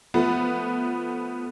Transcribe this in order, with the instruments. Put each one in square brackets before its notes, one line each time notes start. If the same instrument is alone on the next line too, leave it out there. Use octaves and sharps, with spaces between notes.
[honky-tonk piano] F3 A3 B3